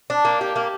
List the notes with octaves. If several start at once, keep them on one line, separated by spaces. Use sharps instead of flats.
D4
A#3
G4
A#3